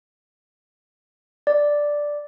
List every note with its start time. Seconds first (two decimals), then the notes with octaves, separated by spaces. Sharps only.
1.47 D5